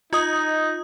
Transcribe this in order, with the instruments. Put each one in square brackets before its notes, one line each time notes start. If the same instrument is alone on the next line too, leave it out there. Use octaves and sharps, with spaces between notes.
[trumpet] D#4 [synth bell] F4 D#5 D#6